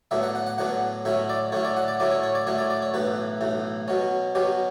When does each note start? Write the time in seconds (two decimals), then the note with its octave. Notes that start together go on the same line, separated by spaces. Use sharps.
0.11 A2 F#3 B3 D4 E5
0.23 F#5
0.35 F#5
0.47 F#5
0.58 A2 F#3 B3 D4 F#5
1.05 A2 F#3 C#4 E4 E5
1.30 D5
1.52 A2 F#3 C#4 E4 C#5
1.65 D5
1.77 F#5
1.88 D5
2.00 A2 F#3 C#4 E4 D5
2.11 C#5
2.23 C#5
2.35 D5
2.47 A2 F#3 C#4 E4 C#5
2.59 D5
2.70 D5
2.82 C#5
2.94 B1 A2 E3 B4
3.41 B1 A2 E3
3.88 B2 F#3 C#4
4.35 B2 F#3 C#4 G4